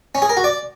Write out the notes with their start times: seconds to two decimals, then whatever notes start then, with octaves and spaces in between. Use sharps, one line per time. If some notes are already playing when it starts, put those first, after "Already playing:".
0.15 C#4
0.22 G#4
0.29 A#4
0.37 F#4
0.44 D5